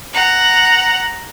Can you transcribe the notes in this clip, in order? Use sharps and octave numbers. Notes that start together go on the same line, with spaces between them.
F#5 A#5